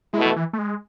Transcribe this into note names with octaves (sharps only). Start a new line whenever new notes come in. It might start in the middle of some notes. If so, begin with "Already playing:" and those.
B2 G#3 A3 E4
E3
E3
A3
G#3